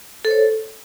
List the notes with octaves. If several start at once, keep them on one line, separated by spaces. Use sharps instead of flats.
A4 C5 C#5